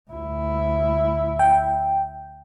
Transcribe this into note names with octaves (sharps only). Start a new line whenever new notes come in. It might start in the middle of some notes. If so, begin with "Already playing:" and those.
D2 E4
G5